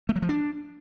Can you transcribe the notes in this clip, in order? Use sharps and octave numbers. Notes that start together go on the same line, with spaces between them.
A3
F#3
F3
D4